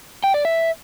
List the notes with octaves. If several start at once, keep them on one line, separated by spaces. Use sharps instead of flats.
G5
D5
E5